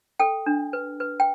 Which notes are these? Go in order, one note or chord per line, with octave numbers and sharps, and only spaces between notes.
A4 G5
D4
B4
B4
G5